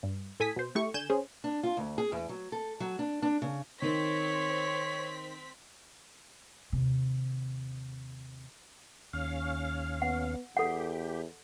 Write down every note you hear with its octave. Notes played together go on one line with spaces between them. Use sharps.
G2
A2 A4 G#5 D#6 B6
B2 C5
A3 E4 G4 C#6
D3 G#5 G6 E7
C#4 G#4 C5
D4
F4
D2
G#4
E2
F#3
A4
F#3
D4
D4
C#3
D#3 C4 C#5 B6
D#2 C3
D#2 C#4 F5
B3 F#5
E2 G4 A4 F#5